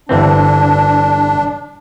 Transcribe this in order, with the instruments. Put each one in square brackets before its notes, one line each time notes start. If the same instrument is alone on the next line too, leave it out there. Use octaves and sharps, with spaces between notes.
[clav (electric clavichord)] G1 E3 C4 [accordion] D4